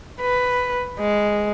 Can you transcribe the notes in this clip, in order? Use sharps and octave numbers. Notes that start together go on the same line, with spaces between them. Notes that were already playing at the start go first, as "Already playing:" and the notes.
B4
G#3